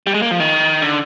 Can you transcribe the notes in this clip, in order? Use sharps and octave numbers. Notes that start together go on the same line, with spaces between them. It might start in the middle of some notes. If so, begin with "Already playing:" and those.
G3
G#3
A#3
F3
D#3
D3